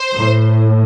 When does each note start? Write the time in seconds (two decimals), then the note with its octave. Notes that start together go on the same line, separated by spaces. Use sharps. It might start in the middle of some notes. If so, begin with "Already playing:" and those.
Already playing: C5
0.14 A2